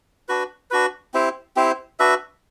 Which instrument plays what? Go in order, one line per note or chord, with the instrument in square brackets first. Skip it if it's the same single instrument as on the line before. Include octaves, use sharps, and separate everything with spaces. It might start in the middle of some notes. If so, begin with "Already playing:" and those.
[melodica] D4 F#4 B4
D4 F#4 B4
C4 E4 G4 C5
C4 E4 G4 C5
D4 F#4 B4 E5